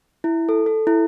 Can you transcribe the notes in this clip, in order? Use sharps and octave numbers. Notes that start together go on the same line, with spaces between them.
E4
A4
A4
E4